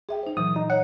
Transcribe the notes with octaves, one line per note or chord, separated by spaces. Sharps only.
G#4 E5 G5
D#4 C5
A#2 E3 F#3 D#6
D#4
C#5 F#5